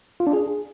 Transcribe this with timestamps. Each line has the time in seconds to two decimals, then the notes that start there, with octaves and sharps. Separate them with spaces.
0.20 F4
0.27 D4
0.33 G#4